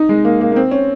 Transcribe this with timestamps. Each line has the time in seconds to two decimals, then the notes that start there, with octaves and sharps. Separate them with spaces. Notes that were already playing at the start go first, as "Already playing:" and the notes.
Already playing: D#4
0.09 G#3
0.25 A#3
0.41 A#3
0.52 A#3
0.56 C4
0.71 C#4